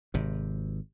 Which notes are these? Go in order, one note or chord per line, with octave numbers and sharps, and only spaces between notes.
G#1 C3